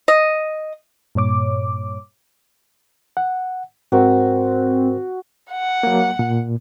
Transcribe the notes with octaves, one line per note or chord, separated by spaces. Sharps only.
D#5
G2 A#2 C#5 D6
F#5
G#2 C4 F#4 A#4 C5
F#5
F#3 A#3
A#2